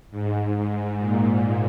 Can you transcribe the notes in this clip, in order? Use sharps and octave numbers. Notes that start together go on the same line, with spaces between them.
G#2
A#2